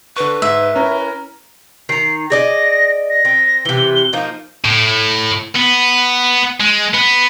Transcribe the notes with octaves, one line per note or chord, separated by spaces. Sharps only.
D3 B4 C#6
G#2 E5
C#4 E4 A#4
D#3 A#5 C7
G#4 D5 D#5 A#6
A#6
C4
C3 E3 G7
F3 A#3 D#4
A2
B3
G#3
B3